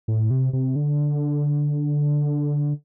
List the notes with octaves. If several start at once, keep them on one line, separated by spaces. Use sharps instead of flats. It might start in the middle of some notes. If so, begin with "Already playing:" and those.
A2
C3
C3
D3